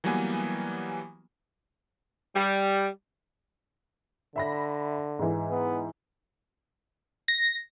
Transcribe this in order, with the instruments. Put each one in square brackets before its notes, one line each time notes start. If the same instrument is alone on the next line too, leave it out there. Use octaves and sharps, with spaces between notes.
[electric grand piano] E3 F#3 G3 A#3 B3 G#5
[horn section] G3
[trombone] D3 [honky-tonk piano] E5 B5 A#6
[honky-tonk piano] G#2 E3
[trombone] B3
[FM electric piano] A#6